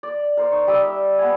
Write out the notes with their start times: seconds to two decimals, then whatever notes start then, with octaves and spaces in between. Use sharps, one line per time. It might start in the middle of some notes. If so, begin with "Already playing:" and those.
0.03 D5
0.37 A#4 C5 D5
0.52 D#4 C#6
0.67 G3 D#5 D6 E6
0.85 E5
1.19 B3 G#5